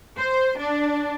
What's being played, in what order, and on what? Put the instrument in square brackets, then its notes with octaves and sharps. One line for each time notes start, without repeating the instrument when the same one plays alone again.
[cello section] C5
D4